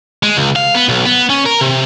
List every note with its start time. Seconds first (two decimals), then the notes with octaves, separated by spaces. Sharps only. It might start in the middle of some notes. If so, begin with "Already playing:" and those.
0.23 G#3
0.37 C#2
0.56 F5
0.75 B3
0.89 B1
1.05 B3
1.30 C#4
1.46 A#4
1.61 C3